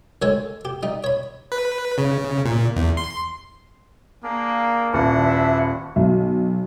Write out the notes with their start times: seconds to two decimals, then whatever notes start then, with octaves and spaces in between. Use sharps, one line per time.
0.22 D2 G#3 A4 C#5 G#5
0.65 G4
0.83 G3 D#4
1.04 C#5 B5
1.52 B4
1.98 C#3
2.45 A#2
2.76 E2
2.97 C6
4.23 A#3 D4 G#4
4.94 D#1 D4 E4 F#5
5.24 B4 E5
5.96 B1